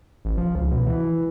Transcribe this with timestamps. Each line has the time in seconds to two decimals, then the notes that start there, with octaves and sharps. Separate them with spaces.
0.25 A1
0.38 F3
0.55 C#2
0.72 B2
0.87 E3